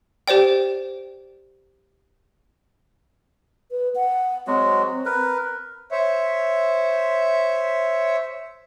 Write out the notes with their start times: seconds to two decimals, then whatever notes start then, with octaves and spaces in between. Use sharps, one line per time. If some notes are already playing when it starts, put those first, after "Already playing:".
0.28 G4 C5 D5 G5
3.71 B4
3.95 F#5
4.47 F#3 G#3 C4 F#4
5.05 A#4 B4
5.91 C5 C#5 E5